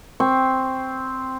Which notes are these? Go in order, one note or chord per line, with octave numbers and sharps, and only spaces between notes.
C4 C#6